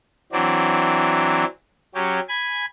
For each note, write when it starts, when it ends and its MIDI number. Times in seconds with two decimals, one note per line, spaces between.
0.32 1.45 52
0.32 1.45 54
0.32 1.45 60
0.32 1.45 62
1.95 2.20 54
1.95 2.20 61
1.95 2.20 67
2.28 2.65 80
2.28 2.65 83
2.28 2.65 92